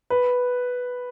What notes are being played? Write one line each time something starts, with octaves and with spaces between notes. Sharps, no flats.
B4